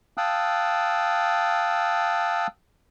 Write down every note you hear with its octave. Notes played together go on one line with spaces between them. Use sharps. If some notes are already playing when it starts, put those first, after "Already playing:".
F5 G5 A5 D#6 E6 F#6